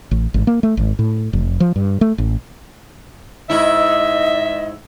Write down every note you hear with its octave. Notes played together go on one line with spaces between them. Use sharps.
A1
G#1
A#3
A3
G#1
A2
F1
F3
G2
A3
A1
G#2 E4 D#5 E5